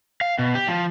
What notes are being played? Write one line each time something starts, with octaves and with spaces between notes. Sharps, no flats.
F5
B2
G4
F3